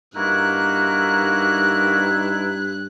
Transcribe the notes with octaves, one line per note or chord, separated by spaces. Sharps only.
G2 A#3 D#4 E4 F#4 A#4 F#6